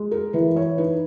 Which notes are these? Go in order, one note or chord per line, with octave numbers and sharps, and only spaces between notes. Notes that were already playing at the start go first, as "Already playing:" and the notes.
Already playing: G#3
A#4
E3 B4
C#5
D#4 B4